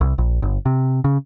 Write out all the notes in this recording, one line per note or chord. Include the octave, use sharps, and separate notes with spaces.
C2
A#1
G1
C3
C#3